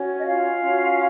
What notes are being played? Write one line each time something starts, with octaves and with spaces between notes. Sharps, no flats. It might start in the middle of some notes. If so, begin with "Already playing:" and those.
Already playing: C#4 F#4 C#5
D#5
F4 F5
C#4 F#4 C#5